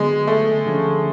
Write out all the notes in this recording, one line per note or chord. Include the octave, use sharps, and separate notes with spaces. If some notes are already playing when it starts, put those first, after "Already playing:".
Already playing: D3 F#3 G#3 B3
A3
D2 D3 F3 G#3 C#4